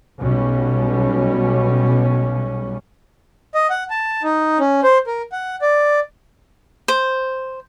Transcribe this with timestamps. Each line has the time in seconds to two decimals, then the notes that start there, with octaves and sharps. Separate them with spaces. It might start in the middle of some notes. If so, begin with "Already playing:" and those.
0.18 B1 B2 G3 C#4
3.55 D#5
3.70 F#5
3.90 A5
4.23 D#4
4.59 C#4
4.83 C5
5.07 A#4
5.32 F#5
5.62 D5
6.88 C5